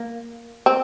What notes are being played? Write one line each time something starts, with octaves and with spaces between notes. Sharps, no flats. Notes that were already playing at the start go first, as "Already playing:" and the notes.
Already playing: A#3
C4